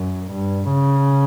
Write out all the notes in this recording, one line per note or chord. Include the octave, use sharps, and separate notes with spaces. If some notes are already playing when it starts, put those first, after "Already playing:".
Already playing: F#2
G2
C#3